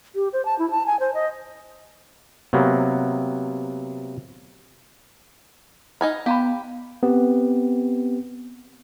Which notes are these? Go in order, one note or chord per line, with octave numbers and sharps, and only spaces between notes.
G4
C5
A5
E4
A5
G#5
C5
D#5
C3 F#3 A#3 B3
D#4 D#5 F#5 G#5 B5 F6
B3 G4 F5 A#5 B5
B3 C4 G4